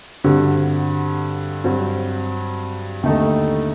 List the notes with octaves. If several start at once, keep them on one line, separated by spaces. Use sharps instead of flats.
G2 D3 G3 C4 F#4
G2 F#3 C4 F#4
D#2 D3 A3 D#4 A4